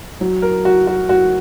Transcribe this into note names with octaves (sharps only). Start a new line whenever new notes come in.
F#3
A#4
F#4
F#4
F#4